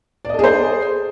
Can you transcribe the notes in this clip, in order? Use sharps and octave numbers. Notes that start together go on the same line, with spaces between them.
G#4 A4 C5 D5 D#5